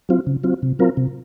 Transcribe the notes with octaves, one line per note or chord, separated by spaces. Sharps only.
F#3 C4 F4
C#3
F#3 C4 F4
C3
F#3 C4 F4 A#4
C3